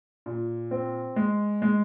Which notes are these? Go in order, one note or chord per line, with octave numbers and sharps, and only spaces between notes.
A#2
C4
G#3
G#3